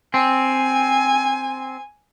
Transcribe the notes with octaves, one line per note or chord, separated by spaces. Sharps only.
C4 G#5